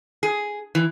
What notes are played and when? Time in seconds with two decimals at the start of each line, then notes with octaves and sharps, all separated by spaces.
0.23 G#4
0.75 E3